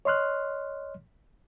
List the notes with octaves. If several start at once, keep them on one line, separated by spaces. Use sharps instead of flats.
C#5 D#5 C6 F6 F#6